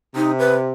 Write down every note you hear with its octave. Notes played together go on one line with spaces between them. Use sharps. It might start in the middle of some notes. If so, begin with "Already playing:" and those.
C3 D#4
B4